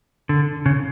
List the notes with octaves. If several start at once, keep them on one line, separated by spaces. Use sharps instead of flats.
D3
C#3